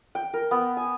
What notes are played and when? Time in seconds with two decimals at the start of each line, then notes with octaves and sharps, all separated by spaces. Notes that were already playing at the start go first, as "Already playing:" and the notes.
0.15 G5
0.34 A#4
0.51 B3
0.77 G#5